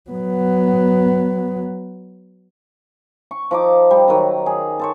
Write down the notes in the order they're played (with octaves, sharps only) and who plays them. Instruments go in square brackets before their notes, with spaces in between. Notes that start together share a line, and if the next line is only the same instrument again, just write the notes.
[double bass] F#3 B3
[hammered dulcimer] C#6
F3 D#4 D6
G3
D#3 F#3
G#4
A4 C5 C#5